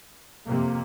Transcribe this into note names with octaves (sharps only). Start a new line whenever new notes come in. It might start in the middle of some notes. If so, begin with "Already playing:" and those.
F2 C3 A#3